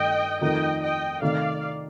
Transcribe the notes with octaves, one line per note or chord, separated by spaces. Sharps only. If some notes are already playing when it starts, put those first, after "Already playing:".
Already playing: G2 D#3 A3 A4 D#5 G5
F2 D#3 A3 D#4 A#4 D#5 G5
D#5 G5
C3 D#3 A3 D5 F5